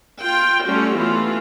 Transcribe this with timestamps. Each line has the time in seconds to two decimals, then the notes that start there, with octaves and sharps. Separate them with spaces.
0.21 F4 G5
0.66 G3 A3 C#4 F4 F#4
0.97 E3 A3 B3 F4